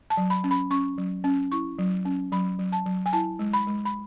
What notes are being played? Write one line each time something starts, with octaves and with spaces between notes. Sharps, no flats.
A5
F#3
B5
C#4
B5
C#4 C#6
F#3
C#4
E4 C#6
F#3
C#4
F#3 B5
F#3
A5
F#3
G#5
E4 A5
G#3
B5
G#3
B5